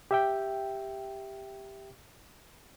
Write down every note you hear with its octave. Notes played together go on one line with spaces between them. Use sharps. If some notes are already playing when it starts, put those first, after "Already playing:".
G4 E5 G5